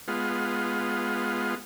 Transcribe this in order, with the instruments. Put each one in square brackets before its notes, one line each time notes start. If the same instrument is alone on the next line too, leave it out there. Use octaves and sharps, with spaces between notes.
[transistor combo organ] G#3 B3 F4